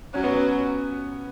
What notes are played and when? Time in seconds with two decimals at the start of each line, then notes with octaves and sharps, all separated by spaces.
0.14 F#3 C#4
0.24 B3
0.34 C#4